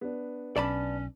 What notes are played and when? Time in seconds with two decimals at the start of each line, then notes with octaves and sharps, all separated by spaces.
0.01 B3 D4
0.56 B1 C#4 D5 A5 B5